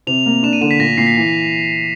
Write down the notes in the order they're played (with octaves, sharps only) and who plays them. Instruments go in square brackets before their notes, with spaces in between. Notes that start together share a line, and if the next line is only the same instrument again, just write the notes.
[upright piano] C3 [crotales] F7
[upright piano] A#3
[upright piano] D4 [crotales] E7
[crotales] D#7
[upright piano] D3 [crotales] E7
[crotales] B6
[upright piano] A#2 [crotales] A#6
[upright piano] A#2 [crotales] C7
[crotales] B6
[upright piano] E3